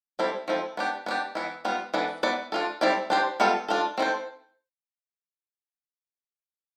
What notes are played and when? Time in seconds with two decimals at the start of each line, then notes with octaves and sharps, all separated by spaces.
0.19 G3 C4 E4 A4 D5
0.48 F3 C4 E4 A4
0.77 B3 D4 G4
1.06 B3 D4 G4
1.35 E3 B3 E4
1.65 G3 B3 F4
1.94 E3 B3 D4 A4
2.23 B3 E4 B4 D5
2.52 D4 F4 A4
2.81 G3 C4 E4 A4 D5
3.10 D4 G4 C5
3.40 G3 B3 F4 A4
3.68 D4 F4 A4
3.98 C4 E4 A4 C5